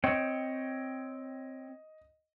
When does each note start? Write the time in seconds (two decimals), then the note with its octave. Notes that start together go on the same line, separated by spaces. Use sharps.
0.04 C4 C#5 D#5 G5